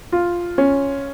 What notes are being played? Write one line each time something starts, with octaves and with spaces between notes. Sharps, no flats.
F4
C#4